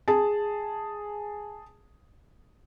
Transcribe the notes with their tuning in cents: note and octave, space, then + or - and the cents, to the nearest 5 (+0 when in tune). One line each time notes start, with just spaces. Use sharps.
G#4 +0 A5 +0